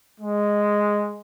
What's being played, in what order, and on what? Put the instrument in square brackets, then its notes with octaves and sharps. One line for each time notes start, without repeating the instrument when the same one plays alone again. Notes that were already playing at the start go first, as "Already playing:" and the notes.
[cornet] G#3